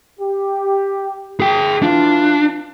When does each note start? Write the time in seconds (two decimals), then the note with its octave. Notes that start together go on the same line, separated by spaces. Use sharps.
0.20 G4
1.40 G#4 G5
1.83 E3 D4 F4